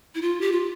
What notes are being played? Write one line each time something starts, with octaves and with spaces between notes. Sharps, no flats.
E4
F4
G4
F4